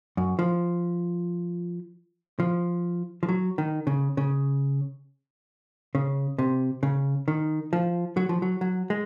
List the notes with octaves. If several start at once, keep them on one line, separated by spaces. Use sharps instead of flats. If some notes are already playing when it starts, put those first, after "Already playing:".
F#2
F3
F3
F3
F#3
D#3
C#3
C#3
C#3
C3
C#3
D#3
F3
F#3
F3
F#3
F#3
G#3